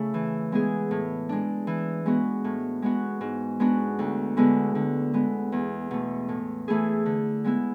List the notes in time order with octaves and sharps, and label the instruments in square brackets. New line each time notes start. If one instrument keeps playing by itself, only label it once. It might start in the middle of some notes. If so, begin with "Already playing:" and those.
Already playing: [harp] C#3 A3 E4
E3
G#3 B3 E4 G#4
A2
G#3 D4
E3
G#3 B3 F#4
A2
G#3 B3 F#4
G#2
G#3 B3 D4 F#4
D2
D3 G#3 B3 E4
D3
G#3 B3
E2
B2 A3
A2
E3 A3 E4 G#4
D3
G#3 B3 E4